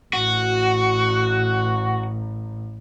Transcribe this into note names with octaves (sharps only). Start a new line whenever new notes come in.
A1 F#4